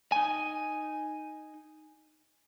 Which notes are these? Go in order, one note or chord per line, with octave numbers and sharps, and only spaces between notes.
D#4 G#5